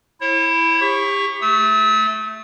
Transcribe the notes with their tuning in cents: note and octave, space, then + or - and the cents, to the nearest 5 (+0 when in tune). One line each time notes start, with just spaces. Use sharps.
E4 +0 C#5 -45
G4 +30 C#6 +0
A3 -5 E6 -45